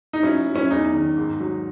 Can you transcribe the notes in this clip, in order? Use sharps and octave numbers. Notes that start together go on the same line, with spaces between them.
D#4
F#3 C#4 E4
F#3
C#4 E4
E2 D#4
D#3
G#2
F#3